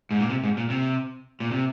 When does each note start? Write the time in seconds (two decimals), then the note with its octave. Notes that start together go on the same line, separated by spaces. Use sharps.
0.11 G#2
0.20 A#2
0.30 C3
0.44 G#2
0.57 A#2
0.70 C3
1.40 A#2
1.51 C3